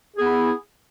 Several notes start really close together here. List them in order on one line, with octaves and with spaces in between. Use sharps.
G#4 B3 E4